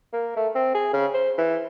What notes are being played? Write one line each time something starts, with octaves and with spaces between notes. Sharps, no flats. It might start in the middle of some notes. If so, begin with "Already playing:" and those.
A#3
A3
C4
G#4
C#3
C5
E3